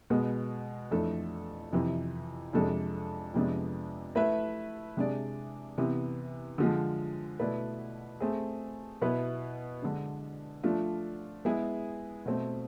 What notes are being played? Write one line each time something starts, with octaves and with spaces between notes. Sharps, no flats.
B2 G#3 B3
F2 E3 A3 D4 A4
F2 C3 E3
F2 C3 G#3 D4 A4
F2 C3 G#3 B3 D4
A3 E4 B4 E5
C3 G#3 D4 G#4 D5
C3 E3 B3
D3 F3 G#3
B2 A3 E4 B4 D5
A3 C4 G#4
B2 B3 E4 B4
D3 G#3 D4
F3 A3 D4 F4
G#3 B3 E4 G#4
B2 A3 C4